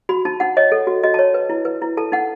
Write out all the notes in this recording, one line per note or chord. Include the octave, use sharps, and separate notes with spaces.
F#4 B5
D#4 A5
D#4 F#5
C#5 D#5
A4
F#4
F#4 D#5
C#5 A5
B4
E4
B4
E4
A4 A5
D#4 F#5